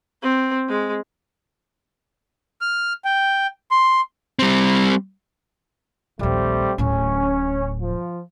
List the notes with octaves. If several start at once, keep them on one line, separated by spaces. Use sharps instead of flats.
C4
G#3
F6
G5
C6
G3 C4
A#1 D#2 G3 A3 C4
D1 A2 C#4
F3